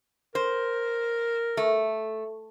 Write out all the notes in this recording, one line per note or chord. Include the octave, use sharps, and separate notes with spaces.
A#4 C5
A3